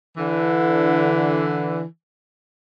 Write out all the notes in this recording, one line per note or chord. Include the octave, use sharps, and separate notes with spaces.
D3 E3